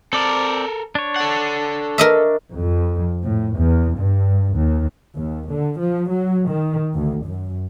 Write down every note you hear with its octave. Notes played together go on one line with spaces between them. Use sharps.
C4 A4 A#4 D5
D4 C#5
A4 F#5
A#4 D#5 E5
F2
A2
E2
G2
D#2
D#2
D3
F3
F#3
D#3
D2
F#2